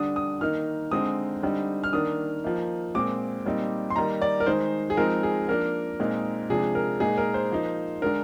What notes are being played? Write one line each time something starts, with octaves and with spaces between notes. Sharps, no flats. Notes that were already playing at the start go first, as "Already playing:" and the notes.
Already playing: D3 G3 D4 D#6
D#6
D#3 A#3 D#4 F6
D3 G#3 C4 D#4 D#6
D3 G3 C4 D#4
F6
D#3 A#3 D4 D#6
F3 A#3 D#4
A#2 G#3 C4 D6
A#2 G3 C4 D#4
C6
D#3 G3 A#3 D#4 A#5
D5
A#4
D#3 G#3 D#4 C5
G#4
F3 G#3 C4 D#4 A#4
G#4
F3 A#3 D4 A#4
A#2 G#3 C4 D#4
C3 F3 G#3 D4 G#4
A#4
A#2 G#3 D#4 G#4
A#4
C5
F3 A#3 D#4
D3 G#3 D4 A#4